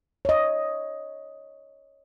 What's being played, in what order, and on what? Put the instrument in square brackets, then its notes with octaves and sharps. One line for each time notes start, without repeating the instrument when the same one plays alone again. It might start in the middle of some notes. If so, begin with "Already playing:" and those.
[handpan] C#5 D#5